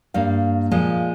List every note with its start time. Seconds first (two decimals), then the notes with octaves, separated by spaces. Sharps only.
0.14 G2 G3 A#3 F5
0.72 A#2 F3 G#3